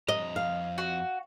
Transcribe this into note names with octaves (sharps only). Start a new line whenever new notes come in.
F2 D#5 A#5
F5
F#4